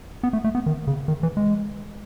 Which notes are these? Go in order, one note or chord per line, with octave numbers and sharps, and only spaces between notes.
B3
A3
A3
B3
D#3
C#3
D#3
E3
G#3